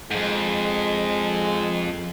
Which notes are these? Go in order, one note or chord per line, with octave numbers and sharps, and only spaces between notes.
F2 G#2 G#3